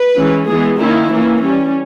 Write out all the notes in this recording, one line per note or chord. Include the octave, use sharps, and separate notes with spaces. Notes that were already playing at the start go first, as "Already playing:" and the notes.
Already playing: B4
E3 G#3 C#4
E3 G#3 B3 G#4
D#3 A#3 C#4 E4
E3 A#3 C#4
G3 C#4